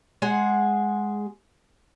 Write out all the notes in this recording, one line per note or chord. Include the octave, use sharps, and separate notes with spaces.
G#3 G#4 F#5